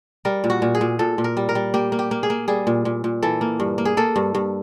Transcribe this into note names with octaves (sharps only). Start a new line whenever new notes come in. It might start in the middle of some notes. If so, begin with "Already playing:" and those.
G3 A#4
A#2
F#4
A#2
G#4
A#2
A#2 A4
A#2
A#4
G3
A#4
G3
A#3 G4
A#3
G4
A#3
G#4
A#3
G3 G#4
A#2
A#2
A#2
E3 A4
A#3
G2
A#3
G#4
A#3 A4
G2
G2